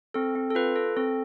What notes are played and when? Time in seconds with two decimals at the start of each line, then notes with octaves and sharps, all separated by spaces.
0.14 C4 A4
0.35 C4
0.51 A4
0.55 F4 B4
0.76 A4
0.97 C4 A4